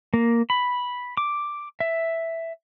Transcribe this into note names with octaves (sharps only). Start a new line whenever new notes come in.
A#3
B5
D6
E5